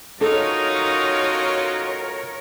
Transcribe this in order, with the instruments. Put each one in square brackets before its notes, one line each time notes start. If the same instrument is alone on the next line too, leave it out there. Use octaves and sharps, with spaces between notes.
[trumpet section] C#4 F4 F#4 [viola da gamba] D#4 [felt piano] A4 [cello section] A#4 C#5